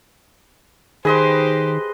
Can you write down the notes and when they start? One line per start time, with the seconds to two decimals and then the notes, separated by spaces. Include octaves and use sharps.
1.05 D#3 G4 G#4 B4 C5 D#5 C6